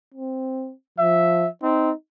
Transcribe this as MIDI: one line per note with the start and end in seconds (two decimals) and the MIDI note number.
0.14 0.72 60
0.99 1.47 53
0.99 1.48 76
1.63 1.90 60
1.63 1.92 63